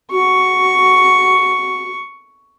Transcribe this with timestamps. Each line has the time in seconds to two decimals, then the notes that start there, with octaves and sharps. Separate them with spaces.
0.11 F#4 C#6